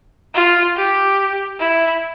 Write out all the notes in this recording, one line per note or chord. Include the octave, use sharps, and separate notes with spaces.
F4
G4
E4